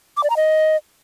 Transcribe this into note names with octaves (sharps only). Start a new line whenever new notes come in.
D6
D5
A#5
D#5